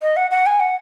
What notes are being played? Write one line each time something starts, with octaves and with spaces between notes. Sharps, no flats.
D#5
F#5
F#5
G#5
F#5